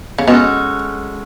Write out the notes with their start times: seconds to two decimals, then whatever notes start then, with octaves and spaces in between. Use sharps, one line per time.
0.19 C#3
0.27 B2 G#3 C#4 F#4 A4